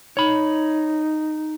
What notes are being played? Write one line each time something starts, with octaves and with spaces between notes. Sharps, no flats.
D#4 C#5 B5